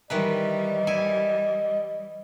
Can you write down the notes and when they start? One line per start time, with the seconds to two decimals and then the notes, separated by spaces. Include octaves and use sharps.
0.10 D#3 E3 G3 B4 D#5
0.87 E4 G#5